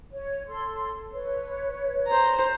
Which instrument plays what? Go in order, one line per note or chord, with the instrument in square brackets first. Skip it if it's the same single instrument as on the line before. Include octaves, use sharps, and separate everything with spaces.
[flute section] C#5
A4 C6
B4 C#5
[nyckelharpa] C5 A#5